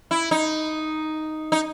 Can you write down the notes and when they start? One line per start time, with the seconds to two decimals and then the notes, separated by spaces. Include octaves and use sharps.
0.11 E4
0.31 D#4
1.52 D#4